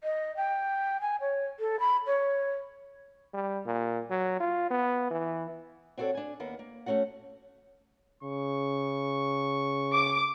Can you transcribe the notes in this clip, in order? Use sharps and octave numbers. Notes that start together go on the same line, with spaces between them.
D#5
G5
G#5
C#5
A4
B5
C#5
G3
A#2
F#3
F4
B3
E3
C4 D4 F#4 G4 A4 C#5
D4 G#5
D#2 A#3 B3
A#3
A3 A#3 C#4 F#4 F#5
C#3 C#6
D6